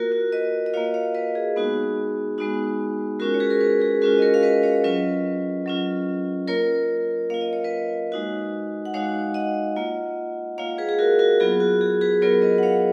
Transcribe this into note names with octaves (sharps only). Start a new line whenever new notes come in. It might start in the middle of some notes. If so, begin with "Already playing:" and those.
Already playing: A#3 F4 F#4 A#4
F#4
B4 D#5
D#5
A#3 F4 C#5 F5
C#5 F5
B4 D#5
G#4
G#3 B3 D#4 F#4
G#3 B3 D#4 F#4
G#3 C#4 F4 F#4 A#4
C#5
G#4 B4
A#4
G#4 B4
G#4 B4
G#3 C#4 F4 F#4 A#4
D#5
A#4 C#5
F5
B4 D#5
C#5 F5
F#3 C#4 F4 B4 D#5
F#3 C#4 F4
A#3 F4 A#4 C#5
A#3 F4 F5
D#5
C#5
B4 D#5
G#3 D#4 F#4
F#5
G#3 D#4 F#4 C#5 F5
D#5 F#5
A#3 F4
A#3 F4 C#5 F5
G#4 B4
G#4
F#4 A#4
F#4 A#4
F#3 B3 F4 G#4
F#4
G#4
G#4 B4
F#3 B3 F4 A#4 C#5
B4 D#5
F#5
C#5 F5